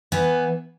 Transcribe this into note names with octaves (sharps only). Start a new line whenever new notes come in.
E3 B3